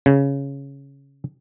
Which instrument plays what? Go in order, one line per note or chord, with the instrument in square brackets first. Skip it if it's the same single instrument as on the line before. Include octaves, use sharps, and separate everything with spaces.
[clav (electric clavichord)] C#3